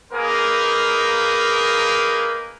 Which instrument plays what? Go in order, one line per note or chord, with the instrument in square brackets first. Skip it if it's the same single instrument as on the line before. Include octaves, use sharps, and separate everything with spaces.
[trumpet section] A#3 D#4 G#4 A#4 B4 F5